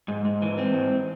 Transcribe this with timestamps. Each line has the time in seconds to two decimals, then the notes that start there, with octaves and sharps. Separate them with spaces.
0.08 G#2
0.25 G#2
0.42 E3
0.58 C4
0.74 G#2